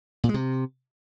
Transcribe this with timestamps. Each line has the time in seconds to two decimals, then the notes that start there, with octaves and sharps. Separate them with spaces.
0.24 A#2
0.29 G#3
0.34 C3